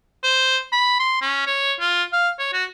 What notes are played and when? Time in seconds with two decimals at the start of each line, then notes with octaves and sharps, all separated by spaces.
0.23 C5
0.72 B5
1.00 C6
1.21 C#4
1.47 C#5
1.80 F4
2.13 F5
2.39 C#5
2.53 F#4